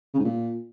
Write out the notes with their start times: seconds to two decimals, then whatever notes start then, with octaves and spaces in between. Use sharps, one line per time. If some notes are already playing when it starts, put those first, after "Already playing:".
0.14 C#3
0.19 G#2
0.24 A#2